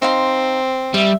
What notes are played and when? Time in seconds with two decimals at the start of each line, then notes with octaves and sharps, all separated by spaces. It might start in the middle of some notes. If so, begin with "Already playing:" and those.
0.02 C4 D#4 F5 C6
0.94 G3 E5